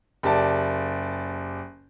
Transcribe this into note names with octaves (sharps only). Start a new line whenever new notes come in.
F#1 G4 D5 A5